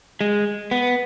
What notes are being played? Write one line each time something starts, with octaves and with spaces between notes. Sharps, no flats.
G#3
B3